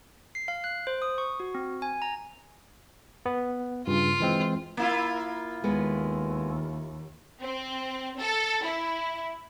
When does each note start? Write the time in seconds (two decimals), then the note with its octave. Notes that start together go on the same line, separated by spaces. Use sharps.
0.35 C7
0.48 F5
0.64 F#6
0.87 C5
1.02 D#6
1.18 C#6
1.40 F#4
1.55 C4
1.82 G#5
2.02 A#5
3.26 B3
3.87 G2 C#3 F4
4.20 E3 G#3 C4
4.77 A#3 E4 F4
5.64 D#2 G#3 B3 B4
7.40 C4
8.18 A4
8.63 E4